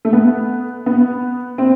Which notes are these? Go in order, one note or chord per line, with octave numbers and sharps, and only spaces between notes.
A3
B3
B3
C4